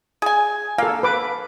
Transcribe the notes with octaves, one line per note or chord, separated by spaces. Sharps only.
G#4 G#5
A#3 A4 F5
B4 D6